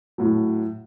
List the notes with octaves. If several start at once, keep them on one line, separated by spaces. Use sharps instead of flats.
A2 F#3